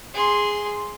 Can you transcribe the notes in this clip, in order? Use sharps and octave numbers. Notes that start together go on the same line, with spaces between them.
G#4 C6